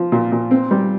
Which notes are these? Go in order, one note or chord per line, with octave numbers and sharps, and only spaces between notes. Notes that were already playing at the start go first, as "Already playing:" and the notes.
Already playing: F3
A#2
A#2
C4
G3